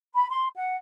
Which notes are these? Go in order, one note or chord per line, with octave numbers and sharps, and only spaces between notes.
B5
C6
F#5